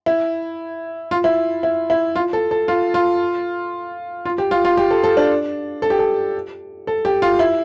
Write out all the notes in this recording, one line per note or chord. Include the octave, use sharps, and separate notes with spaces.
E4
F4
E4
E4
E4
F4
A4
A4
F4
F4
F4
G4
F4
F4
G4
A4
A4
D4
A4
G4
A4
A4
G4
F4
E4